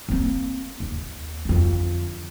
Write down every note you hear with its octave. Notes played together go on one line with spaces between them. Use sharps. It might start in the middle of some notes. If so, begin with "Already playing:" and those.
A#3 C4
D#2
F2 D3